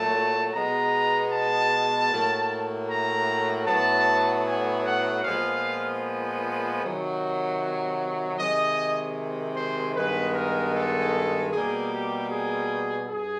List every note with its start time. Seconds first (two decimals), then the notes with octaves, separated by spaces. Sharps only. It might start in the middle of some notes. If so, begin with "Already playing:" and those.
Already playing: A#2 F#3 A3 A5
0.53 B2 G#3 B3 A#5
1.32 A5
2.10 A2 F#3 A#3
2.89 A#5
3.67 A2 F#3 B3 A5
4.46 G#5
4.85 F#5
5.24 A#2 F3 G#3 B3 F5
6.81 C3 D#3 F#3
8.38 C3 D#3 G#3 D#5
9.56 C5
9.95 G2 D#3 G#3 B3 B4
10.34 A#4
10.74 A4
11.52 B2 G3 A#3 G#4
11.91 G4
12.30 G#4
13.09 G2 G#4